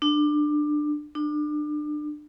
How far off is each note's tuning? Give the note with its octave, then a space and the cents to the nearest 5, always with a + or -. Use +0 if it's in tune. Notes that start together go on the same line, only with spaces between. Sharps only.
D4 +20
D4 +30